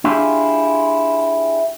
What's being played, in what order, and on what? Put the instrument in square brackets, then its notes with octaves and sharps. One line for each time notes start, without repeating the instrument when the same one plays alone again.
[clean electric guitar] D4 E4 F4 G4 G#4